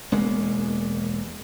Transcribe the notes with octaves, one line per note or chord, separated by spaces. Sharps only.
E1 G#3 A#3 B3